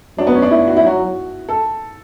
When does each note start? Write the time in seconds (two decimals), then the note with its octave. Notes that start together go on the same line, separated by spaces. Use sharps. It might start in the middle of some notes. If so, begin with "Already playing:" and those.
0.18 F#3 D4
0.27 B3
0.35 C#4
0.42 D4
0.51 E4
0.67 F#4
0.77 E4
0.83 F#3 F#4
1.49 A4